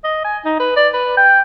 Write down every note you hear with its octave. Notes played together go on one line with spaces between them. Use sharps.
D#5
G#5
D#4
B4
D5
B4
G5